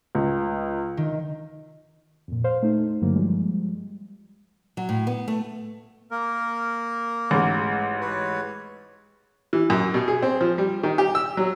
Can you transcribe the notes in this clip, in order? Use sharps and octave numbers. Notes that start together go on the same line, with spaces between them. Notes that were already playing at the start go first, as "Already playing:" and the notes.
C#2
D#3
F2 A#2
C5 F5
A3 D#4
G2 D3 D#3 F#3 A#3
F3 G3 G#3
F#3
A2
B3
A3
A#3 A#4
A1 G#2
B4 C#5
E3
F#2
B2
G#4
C4
F3
G3
D#3
G4
E6
F#3